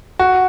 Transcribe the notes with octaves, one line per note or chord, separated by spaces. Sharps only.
F#4